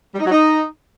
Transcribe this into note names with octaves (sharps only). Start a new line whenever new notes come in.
G3
D#4
F#3
D#4